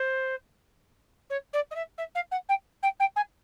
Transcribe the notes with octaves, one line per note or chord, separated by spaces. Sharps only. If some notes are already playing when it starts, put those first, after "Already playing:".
Already playing: C5
C#5
D5
D#5
E5
E5
F5
F#5
G5
G5
G5
G#5